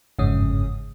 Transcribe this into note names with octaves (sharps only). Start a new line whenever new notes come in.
G1 F2 G#2 C#3 C#4 D#6